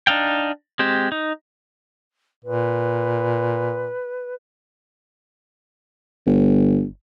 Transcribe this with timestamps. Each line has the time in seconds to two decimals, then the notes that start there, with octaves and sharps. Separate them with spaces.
0.07 D4 D#4 F5 G5
0.79 G#3 C4 G4
1.12 D#4
2.44 A#2 B4
6.26 G1